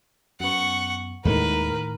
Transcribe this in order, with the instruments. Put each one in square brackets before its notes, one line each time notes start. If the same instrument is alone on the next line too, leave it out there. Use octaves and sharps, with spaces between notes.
[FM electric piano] F#2 B3 [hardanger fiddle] F#5 C#6
[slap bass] D#2 G#3 A3 [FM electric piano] A2 D#3 [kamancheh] A#4 [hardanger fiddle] B4